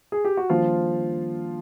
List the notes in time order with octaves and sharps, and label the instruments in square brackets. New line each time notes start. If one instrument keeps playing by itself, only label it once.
[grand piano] G#4
G4
F#4
[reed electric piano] D#3 G3 A#3 D4 [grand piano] F3 F4